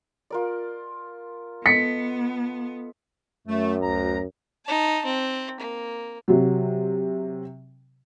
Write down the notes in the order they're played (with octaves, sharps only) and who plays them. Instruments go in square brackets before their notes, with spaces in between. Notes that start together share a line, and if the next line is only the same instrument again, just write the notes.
[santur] F4 A#4 D5
[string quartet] B3 [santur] A4 D#5 [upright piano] B6 C#7
[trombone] F#2 [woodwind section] A3
[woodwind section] D2 A#5
[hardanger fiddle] D#4 A5
C4
A#3
[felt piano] C3 F#3